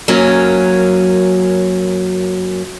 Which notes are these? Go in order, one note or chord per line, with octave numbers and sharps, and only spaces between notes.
F#2 F#3 A#3 C#4